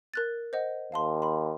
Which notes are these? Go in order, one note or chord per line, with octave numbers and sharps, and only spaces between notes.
A#4 F#6 A6
C5 D#5 F#5
D#2 F5 A5 C6
B5 C6